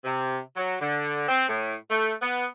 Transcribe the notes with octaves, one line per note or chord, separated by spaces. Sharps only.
C3
F#3
D3
C4
A2
A3
B3